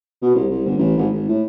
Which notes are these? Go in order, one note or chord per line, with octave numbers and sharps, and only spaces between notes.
B2
C2
C2
G1
A1
G#1
G#1
A2